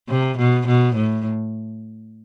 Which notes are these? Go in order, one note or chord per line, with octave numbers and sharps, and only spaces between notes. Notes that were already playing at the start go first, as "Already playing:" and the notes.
C3
B2
B2
A2